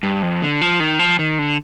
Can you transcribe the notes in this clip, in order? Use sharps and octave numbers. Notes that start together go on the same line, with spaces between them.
G2
F2
D3
F3
D#3
F3
D#3
D3